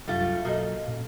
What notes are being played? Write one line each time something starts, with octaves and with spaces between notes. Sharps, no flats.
C2 F#2 G3 A3 F4
B1 A#3 F#4 A4 D#5
A#2 C#4